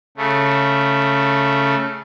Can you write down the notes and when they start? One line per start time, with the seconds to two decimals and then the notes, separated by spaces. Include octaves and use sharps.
0.17 C#3 A3